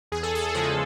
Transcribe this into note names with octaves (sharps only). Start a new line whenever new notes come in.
E2 G#4
A4
G#4
C#3 F3 G#3 A4